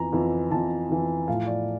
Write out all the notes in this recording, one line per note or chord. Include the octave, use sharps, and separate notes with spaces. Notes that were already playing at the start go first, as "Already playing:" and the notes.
Already playing: F2 E3 A#5
F2 E3
F2 E3 A5
F2 E3
A2 F3 F5
D5